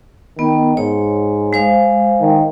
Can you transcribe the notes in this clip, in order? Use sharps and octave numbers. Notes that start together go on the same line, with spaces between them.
D#3 B3
G#2 C#5
G#3 C5 F5
D#3